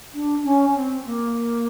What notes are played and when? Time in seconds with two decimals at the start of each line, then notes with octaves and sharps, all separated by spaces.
0.14 D4
0.44 C#4
0.75 C4
1.05 A#3